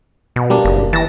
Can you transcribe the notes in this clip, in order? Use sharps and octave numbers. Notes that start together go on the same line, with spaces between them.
B2
G3 A#3 D4
F#1
E3 A5 A#6